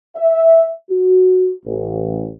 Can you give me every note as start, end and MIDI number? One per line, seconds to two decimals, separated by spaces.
0.16 0.67 76
0.90 1.52 66
1.65 2.28 33